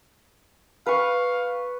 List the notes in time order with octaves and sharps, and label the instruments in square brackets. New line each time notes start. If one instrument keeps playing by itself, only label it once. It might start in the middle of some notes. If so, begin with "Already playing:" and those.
[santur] B4 C#6 [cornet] F5